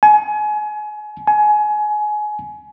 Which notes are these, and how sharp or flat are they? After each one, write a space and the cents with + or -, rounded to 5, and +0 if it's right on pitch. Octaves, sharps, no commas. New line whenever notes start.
G#5 +30
G#5 +25